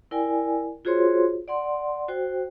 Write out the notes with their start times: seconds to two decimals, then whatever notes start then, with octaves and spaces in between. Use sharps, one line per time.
0.11 E4 A#4 D5 G5 G#5
0.85 F4 F#4 G#4 C5 C#5 C6
1.48 D5 F#5 C6
2.08 F#4 C5 G5